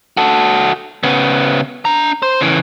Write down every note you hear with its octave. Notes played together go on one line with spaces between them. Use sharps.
F#4 A4
C#3 B3
D4 A#5
C5
C#3 E3